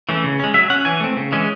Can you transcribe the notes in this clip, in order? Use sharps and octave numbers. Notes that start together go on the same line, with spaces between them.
E3 A3 C#4
C#3
G#3 C#4
F#3 E5
C#4 F#5
E3 G#5
A3 C4
C#3
E3 G#3 C#4